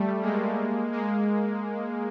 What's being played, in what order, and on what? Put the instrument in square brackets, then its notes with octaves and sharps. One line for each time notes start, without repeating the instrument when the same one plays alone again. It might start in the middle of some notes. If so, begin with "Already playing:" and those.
Already playing: [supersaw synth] G3 A3
G#3 A#3
G#3 A#3